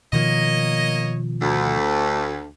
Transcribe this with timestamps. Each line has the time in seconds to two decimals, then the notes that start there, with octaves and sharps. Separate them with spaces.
0.13 B2 D#3 F3 A#3 C#5 D#5
1.42 D2